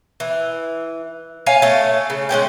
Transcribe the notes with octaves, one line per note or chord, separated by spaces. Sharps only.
E3
C#5 F5 G#5
A3 C#4
C#3
G#3 B3 C#4 G5